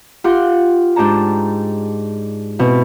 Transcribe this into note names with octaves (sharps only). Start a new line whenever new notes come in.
F4 G4 F#5 C6
G#2 D4 G4 D5 A5 A#5
B2 C4 E4